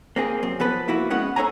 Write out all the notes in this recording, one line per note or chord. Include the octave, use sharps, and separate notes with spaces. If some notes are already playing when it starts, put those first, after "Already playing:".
A#3 C4 G#4
F#2 C4
F3 B3 A4 B4
A#3 E4 F#4 B4
G#3 B3 C#4 F#5
A4 A#4 C5 C#5 G#5 A#5